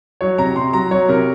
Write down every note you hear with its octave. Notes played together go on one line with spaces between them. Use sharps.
F#3 C#5
C3 A#5
C3 C6
F#3 A#5
F#3 C#5
C3 A#4